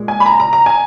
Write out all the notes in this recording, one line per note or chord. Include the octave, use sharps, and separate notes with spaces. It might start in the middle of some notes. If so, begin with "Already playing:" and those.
Already playing: A#2 G#3
G#5
B5
A#5
A#5
A#5
G#5